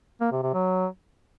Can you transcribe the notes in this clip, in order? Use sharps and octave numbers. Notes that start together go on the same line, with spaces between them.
A#3
C3
C3
F#3